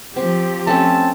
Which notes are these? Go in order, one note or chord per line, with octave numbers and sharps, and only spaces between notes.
F3 C4 G4
A3 C4 C#4 A5